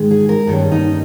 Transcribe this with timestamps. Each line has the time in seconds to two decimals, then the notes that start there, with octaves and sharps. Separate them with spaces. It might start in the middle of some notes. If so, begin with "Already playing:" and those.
Already playing: G#2 D#3 G#3
0.11 G#4
0.29 A#4
0.47 G2 D#3 A#3 C#4
0.72 D#4